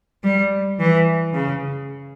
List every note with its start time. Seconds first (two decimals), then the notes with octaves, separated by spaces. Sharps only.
0.24 G3
0.80 E3
1.34 C#3